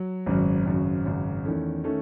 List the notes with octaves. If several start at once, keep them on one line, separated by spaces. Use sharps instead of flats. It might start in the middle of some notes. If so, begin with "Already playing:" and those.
Already playing: F#3
G#1 F#2 C#3 F#3
G#1 F#2 C#3 F#3
G#1 F#2 C#3 F#3
E2 D#3 A3 C#4
D#3 A3 C#4